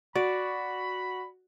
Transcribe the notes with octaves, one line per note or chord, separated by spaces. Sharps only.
F#4 D5 B5